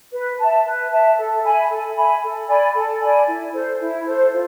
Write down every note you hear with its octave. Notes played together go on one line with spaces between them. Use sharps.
B4
E5 A5
B4
E5 A5
A4
E5 G#5 B5
A4
E5 G#5 B5
A4
D5 G#5 B5
A4
D5 G#5 B5
E4
A4 C5
E4
A4 C5
F4